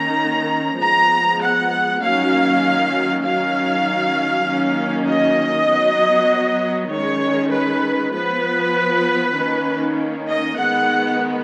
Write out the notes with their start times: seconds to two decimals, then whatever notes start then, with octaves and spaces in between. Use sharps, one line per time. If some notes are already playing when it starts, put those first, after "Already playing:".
Already playing: D#3 A#3 C#4 A#5
0.79 F3 G#3 B3 A#5
1.41 F#5
2.02 D#3 F#3 A#3 C#4 F5
3.24 D#3 F#3 C#4 F5
4.47 D#3 F#3 A#3 C#4
5.07 D#5
5.69 F#3 B3
6.90 D#3 G#3 C#4 C#5
7.52 B4
8.13 F3 B3 B4
9.35 D#3 A#3 C#4
10.27 D#5
10.58 D#3 G#3 B3 F#5